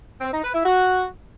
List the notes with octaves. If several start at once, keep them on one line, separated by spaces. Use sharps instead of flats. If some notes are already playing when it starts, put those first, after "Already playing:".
C4
D#4
B4
E4
F#4